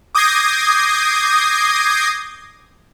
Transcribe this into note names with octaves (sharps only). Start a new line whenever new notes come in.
D6 D#6 G6 G#6 A#6 C7